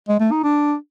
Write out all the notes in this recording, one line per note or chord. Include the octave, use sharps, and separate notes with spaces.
G#3
A3
D#4
D4